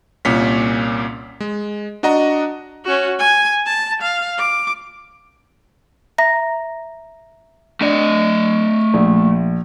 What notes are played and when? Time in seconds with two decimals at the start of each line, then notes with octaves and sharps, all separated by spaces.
0.25 C2 A#2 A#3 C#4 B6
1.40 G#3
2.03 D4 F#4 D#5 F#5 A#5
2.85 C#4 F#4
3.19 G#5
3.66 A5
4.02 F5
4.38 D6
6.18 E5 A#5 A#6
7.81 A3 D4 D#5
8.94 A#1